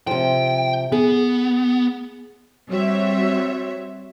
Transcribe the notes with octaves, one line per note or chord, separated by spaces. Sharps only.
C3 F3 G5
B3 G#4
G3 C4 F#4 C#5 E5